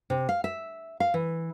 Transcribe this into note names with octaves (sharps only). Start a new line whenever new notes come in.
C3
F5
E5
F5
E3